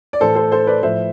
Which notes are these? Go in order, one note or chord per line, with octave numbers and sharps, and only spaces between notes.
D5
A2 E3 A4 C5
A4 C5
A4 C5
B4 D5
A2 F3 C5 E5